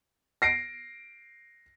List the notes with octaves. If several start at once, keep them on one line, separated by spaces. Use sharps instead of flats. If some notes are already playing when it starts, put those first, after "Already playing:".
A#6 C7 D7